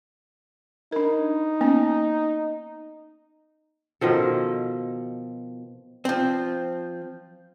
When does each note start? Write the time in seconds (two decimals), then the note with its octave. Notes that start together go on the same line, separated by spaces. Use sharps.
0.92 D4 D#4 A#4
1.61 A#3 B3 C#4
4.01 B2 D#3 F3 A4
6.05 F3 C4